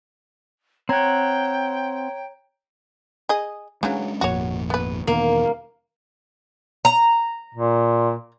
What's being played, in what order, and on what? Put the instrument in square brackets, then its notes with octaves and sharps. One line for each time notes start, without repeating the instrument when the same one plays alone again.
[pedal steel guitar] C4 F#5 [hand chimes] C#5 A#5 G#6 [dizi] G5
[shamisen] G#4 D#5
[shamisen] C#3 E3 F#3 [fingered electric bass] G#3 C#4 D4
[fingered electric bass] G#1 F2 A#2 [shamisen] F#4 C#5
[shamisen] B3 B4
[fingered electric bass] E2 B2 D#3 [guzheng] A#3
[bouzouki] A#5
[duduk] A#2